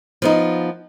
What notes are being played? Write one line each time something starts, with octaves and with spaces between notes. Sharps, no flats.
F3 B3 D#4